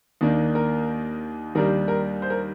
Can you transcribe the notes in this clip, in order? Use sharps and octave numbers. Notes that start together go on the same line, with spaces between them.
D#2 D#3 A#3 D4
A#4
D#2 D#3 G3 D4 A#4
A#4
C5
A#4